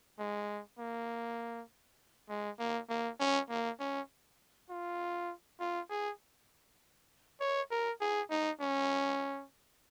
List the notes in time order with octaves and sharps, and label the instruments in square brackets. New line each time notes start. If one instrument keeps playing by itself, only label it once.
[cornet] G#3
A#3
G#3
A#3
A#3
C#4
A#3
C#4
F4
F4
G#4
C#5
A#4
G#4
D#4
C#4